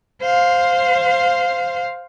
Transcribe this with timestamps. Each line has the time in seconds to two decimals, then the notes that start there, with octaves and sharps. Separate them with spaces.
0.21 C5 F5